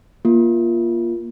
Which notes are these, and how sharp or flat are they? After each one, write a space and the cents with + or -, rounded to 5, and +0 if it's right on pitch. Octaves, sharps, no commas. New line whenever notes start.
A#3 +25 F4 -10